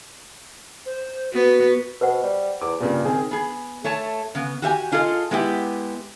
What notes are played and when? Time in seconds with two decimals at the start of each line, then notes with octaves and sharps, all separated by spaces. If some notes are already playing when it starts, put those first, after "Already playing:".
0.86 C5
1.33 B3 F#4
2.01 B2 B4 C5 F#5
2.23 G3
2.61 E2 D6
2.80 G2 A#2 C#3
3.05 D#3 C4 G#4
3.31 B3 G#4
3.84 A3 C#5 A5
4.35 C#3 B3
4.62 F#4 G4 E5 G#5
4.92 D4 F4 G#4 A4 D#5
5.31 G#3 B3 E4 G4